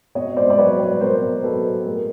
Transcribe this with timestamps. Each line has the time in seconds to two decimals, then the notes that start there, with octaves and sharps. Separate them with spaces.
0.15 B2 C#5 D#5
0.37 C5 D5
0.50 D5
0.58 F#3 B4 C#5
0.80 B4 C#5
1.01 B2 A#4 C5
1.44 F#3 A4 B4
1.86 A2 G#4 A#4